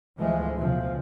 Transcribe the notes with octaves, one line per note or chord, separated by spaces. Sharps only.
D2 E3 F3 G#3 A3
B1 C#3 F3